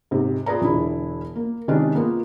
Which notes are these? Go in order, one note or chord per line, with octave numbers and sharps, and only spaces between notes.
G#2 C3
F4 G#4 B4 D5 A#5
E1 D3 E4 G#4
A#3
C3 D#3 G#3 C#4 D4
A#3 B3 F4